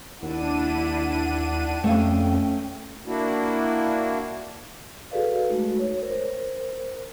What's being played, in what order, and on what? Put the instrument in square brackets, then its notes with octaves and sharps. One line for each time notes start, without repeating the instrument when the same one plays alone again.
[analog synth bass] D#2 [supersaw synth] D4 D#7 [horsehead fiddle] E4 F#5
[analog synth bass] F2 [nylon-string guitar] A3 F5 [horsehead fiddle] C#4 G5
[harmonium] A#3 D4 E4 F#4
[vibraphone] F#4 G#4 A4 B4 D5 F5
G#3 A3 D#4 F#4
C#5
A#4 C5